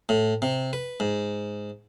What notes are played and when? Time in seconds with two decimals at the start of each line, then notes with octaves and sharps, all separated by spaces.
0.09 A2
0.42 C3
0.73 B4
1.00 G#2